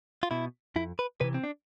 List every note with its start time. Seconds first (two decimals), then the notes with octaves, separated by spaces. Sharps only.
0.23 F4
0.31 B2 E4
0.76 F2 E4
0.99 B4
1.21 C3 E3 B4
1.34 C4
1.44 D4